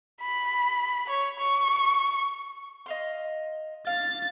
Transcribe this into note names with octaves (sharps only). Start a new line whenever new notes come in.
B5
C#5
C#6
D#5 F5 C6
F5 A6